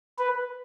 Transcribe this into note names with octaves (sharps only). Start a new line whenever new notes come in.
B4